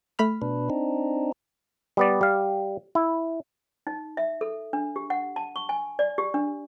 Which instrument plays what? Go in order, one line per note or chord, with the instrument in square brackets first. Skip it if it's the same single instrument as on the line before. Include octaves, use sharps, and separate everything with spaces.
[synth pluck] A3 B5 F6
[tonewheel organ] B2 D4 B4
C4 D4 D#4
[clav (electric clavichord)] G3 B3 D5
G3 F5
E4
[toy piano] D#4
E5
A4
D4
G4
F#5
A5
C#6
G#5
D5
G4
D4